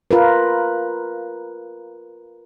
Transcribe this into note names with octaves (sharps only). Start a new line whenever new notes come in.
F4 A#4 B4